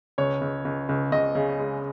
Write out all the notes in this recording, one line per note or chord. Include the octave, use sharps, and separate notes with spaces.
C#2 C#5
C#2
C#2
C#2
C#2 D#5
C#3
G#3